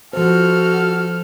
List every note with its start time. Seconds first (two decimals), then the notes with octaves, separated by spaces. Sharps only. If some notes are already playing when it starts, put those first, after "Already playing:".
0.13 F3 F#4 A4 C5 F6